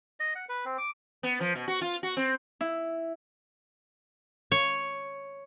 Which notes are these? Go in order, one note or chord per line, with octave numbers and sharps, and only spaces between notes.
D#5
F#5
B4
C4
D6
B3
F3
B2
F#4
F4
F#4
C4
E4
C#5